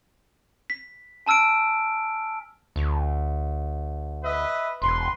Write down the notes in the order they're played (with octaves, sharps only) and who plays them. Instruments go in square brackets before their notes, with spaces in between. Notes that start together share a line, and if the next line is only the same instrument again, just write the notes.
[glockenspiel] B6
G#5 A5 E6 F6 D7
[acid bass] D2
[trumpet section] B4 D#5 E5
[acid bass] E1 [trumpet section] B4 C6